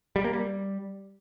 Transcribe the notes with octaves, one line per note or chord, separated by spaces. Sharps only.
G3
A#3
G3